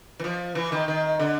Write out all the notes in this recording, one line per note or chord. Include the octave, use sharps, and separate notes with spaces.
E3
F3
E3
D#3
D#3
D3